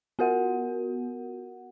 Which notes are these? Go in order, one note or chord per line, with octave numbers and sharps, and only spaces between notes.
B3 F#4 A#4 F#5